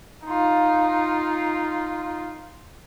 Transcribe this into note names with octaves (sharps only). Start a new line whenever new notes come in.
D#4 F4